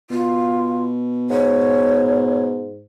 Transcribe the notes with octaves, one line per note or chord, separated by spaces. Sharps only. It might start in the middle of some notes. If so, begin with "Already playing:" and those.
B2 F4
G#2 C#5